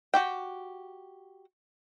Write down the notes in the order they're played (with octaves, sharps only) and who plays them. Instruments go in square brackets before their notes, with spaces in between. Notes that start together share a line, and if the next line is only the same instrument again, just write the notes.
[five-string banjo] F#4 G4 G5